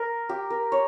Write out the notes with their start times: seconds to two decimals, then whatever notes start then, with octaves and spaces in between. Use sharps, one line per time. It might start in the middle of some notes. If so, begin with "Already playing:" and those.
Already playing: A#4
0.29 G4
0.50 A#4
0.72 C#5